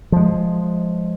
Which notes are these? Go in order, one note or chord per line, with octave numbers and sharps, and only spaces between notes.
F3 G#3